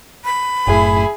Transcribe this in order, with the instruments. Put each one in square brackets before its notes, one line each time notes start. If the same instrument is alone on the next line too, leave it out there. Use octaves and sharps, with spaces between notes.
[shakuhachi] B5
[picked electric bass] F#1 F#2 A2 [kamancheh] E4 G#4